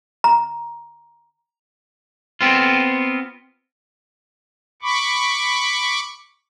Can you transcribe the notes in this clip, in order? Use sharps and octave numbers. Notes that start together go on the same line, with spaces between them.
A#5
B3 C4 F4
B5 C#6 D6